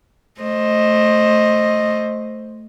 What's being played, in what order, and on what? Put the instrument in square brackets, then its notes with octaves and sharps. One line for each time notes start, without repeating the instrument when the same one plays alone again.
[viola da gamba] A3 C5 D#5